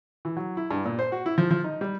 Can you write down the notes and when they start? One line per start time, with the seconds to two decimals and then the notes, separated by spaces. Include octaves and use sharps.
0.25 E3
0.37 F#3
0.57 E4
0.71 G2
0.85 A#2
0.99 C5
1.12 F#4
1.26 E4
1.38 F3
1.51 F3
1.64 D#4
1.81 G3